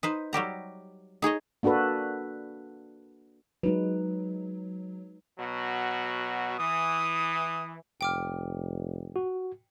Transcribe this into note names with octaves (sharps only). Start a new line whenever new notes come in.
D#4 B4 C5
F#3 G3 G4 A#5
D#4 G#4 C#5 D#5
A#3 D4 F#4 A4 B4
F#3 G#3 D#4 B4
B2 F#3 F#4
E3 D#6
F1 G5 D6 F6
F#4